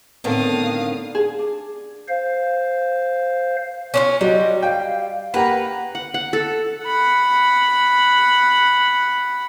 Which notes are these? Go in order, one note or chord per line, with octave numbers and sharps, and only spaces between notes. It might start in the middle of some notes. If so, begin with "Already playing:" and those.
A2 D3 D#3 B3 C4 A4 F5 D#6
G#4
D4
C5 F5
C#4 D4 F4
F#3 G3 F#4 D#5
F5 G5
A#3 G4 B4 F#5 A#5
F#5
F#5
A4
F#5 B5